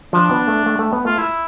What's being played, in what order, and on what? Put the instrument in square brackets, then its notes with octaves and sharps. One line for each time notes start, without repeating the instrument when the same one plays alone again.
[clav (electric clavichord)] F3 [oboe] D4
[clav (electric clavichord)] B3
A3
A3
A3
B3
[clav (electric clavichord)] A3 [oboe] F4
[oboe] E4